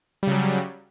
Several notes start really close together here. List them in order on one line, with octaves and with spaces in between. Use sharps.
G3 C#3 F#3